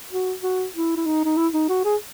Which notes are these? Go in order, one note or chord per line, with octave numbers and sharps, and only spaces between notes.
F#4
F#4
E4
E4
D#4
D#4
E4
D#4
F#4
G#4